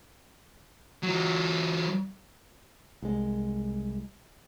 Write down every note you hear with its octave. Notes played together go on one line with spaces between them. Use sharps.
E3 F#3
C2 G#3